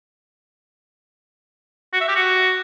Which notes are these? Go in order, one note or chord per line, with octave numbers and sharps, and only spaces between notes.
F#4
E5
G4
F#4